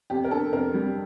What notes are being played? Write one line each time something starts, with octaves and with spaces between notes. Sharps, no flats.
F2 G4
A#4
D3 A4
F2 A#4
G3